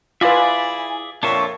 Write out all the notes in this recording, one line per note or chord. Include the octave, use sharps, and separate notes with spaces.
E4 F4 G#4 B4 D5 E5 G#5
F2 A#2 D4 F4 C#5 E5 C#6